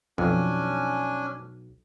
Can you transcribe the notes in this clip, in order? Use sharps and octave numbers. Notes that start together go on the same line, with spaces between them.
B1 F2 C#4 D4 G#5